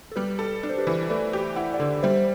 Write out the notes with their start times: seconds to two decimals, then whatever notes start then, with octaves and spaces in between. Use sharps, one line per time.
0.12 A4
0.16 G3 G4 B4
0.39 A4
0.63 D4
0.69 C5
0.78 G4 B4
0.87 E3
1.09 A3 B4 D5
1.33 G4
1.56 E4 F#5
1.74 D5 F#5
1.79 D3
2.03 G3 C5 E5